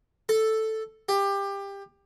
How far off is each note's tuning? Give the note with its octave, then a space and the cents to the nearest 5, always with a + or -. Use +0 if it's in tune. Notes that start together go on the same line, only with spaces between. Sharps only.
A4 +0
G4 +20